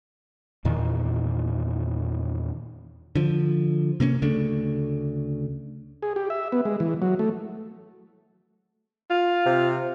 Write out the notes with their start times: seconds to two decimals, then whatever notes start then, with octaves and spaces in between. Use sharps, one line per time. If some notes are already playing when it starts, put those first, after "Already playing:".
0.65 E2 A#2 D#3 E3
3.15 D3 F3
4.00 C3 A#3 B3 C#4
4.22 D2 C#3 A3 D4
6.02 G#4
6.16 G4
6.30 E5
6.52 B3
6.65 G#3
6.80 E3
7.02 F#3
7.19 A3
9.10 F4
9.46 C3